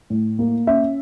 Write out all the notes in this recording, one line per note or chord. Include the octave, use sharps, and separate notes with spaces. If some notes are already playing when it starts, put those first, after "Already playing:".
A2
A#3
C#4 E5